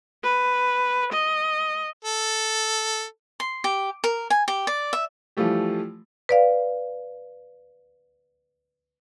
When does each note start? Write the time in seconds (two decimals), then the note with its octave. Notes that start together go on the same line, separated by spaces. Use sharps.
0.24 B4
1.12 D#5
2.05 A4
3.40 C6
3.64 G4
4.04 A#4
4.30 G#5
4.48 G4
4.67 D5
4.93 E5
5.37 E3 F3 G3 A3 G4
6.29 B4 D5 F5